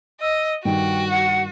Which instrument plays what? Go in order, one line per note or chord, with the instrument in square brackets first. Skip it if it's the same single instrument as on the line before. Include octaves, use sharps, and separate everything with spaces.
[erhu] D#5 [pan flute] E6
[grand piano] G2 D#3 [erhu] F#4 [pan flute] G5
[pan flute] F#5